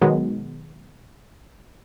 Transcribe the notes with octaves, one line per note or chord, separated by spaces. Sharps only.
B2 D#3 F#3 G#3 B3